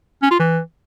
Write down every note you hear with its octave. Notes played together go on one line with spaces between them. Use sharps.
C#4
F4
E3